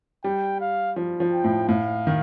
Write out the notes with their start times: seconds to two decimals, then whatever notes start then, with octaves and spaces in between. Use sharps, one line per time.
0.24 G3 G5
0.61 F5
0.96 F3
1.20 F3
1.32 G5
1.44 A2
1.69 A2 F5
2.07 D#3